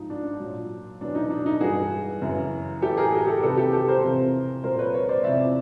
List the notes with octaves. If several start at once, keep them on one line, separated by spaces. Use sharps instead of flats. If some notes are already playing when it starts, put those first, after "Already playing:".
Already playing: G#2 F3 D#4
D4
A#2 F#3
E2 B2 F#3 D4
D#4
D4
D#4
G2 E3 F#4 G#4
F#2 C#3 E3
A2 E3 G4 A4
G#4 A#4
F#4 G#4
G4 A4
E2 C3 D#3 A4 B4
G4 A4
G4 A4
A#4 C5
E2 C3 F3
A#2 F#3 A#4 C5
B4 C#5
B4 C#5
C5 D5
E2 C3 F3 D5 E5